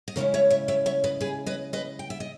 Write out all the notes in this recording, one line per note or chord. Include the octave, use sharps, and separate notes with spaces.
D#5
C#3 G#3 C#4 E4 A#4 C#5
C#5 E5
C#5 E5
C#5 E5
C#5 E5
B4 D#5
G#4 B4
B4 D#5
B4 D#5
G5
E5
D#5